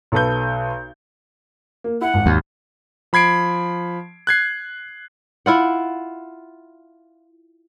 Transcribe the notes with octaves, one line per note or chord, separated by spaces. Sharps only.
B1 A4 B4 G6
A#3
E4 F#5
G#1
D#2
F3 B5 G#6 C7 D7
F#6 G#6 C7
E4 F4 F#5